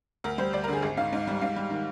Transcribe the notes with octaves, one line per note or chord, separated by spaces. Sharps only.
D2 A#4
G3 C5
D2 D5
A#4
D3 G#4
G#1 G#4
G#2 F5
G#2
G3
G#2 F5
G3
D#3